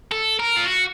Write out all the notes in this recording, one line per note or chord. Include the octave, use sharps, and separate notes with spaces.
A4
A#4
F4
F#4